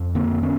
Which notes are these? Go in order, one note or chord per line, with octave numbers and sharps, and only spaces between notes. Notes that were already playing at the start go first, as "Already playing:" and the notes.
Already playing: F2
D3 A#3 C4
D3 B3 C#4